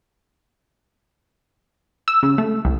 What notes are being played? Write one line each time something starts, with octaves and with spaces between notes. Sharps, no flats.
E6
C#3
A3
C2